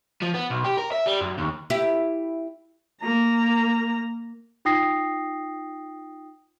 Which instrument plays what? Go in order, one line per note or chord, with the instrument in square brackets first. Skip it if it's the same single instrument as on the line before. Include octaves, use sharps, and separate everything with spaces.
[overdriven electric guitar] F3
B3
B1
G4
A#4
E5
G3
F#2
D#2
[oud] E4 G4
[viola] A#3 A#5
[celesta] D#4 F4 G5 D#6 A#6 C7